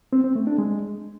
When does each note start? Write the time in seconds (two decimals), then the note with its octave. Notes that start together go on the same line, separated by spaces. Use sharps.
0.13 C4
0.24 C4
0.35 A3
0.47 D4
0.58 G#3